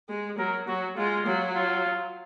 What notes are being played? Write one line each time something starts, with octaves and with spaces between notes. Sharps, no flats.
G#3
F#3 A#4
F#3 F#4
G#3 F4
F#3
F4